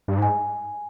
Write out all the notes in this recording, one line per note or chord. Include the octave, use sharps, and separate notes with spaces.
G2
G#2 G#5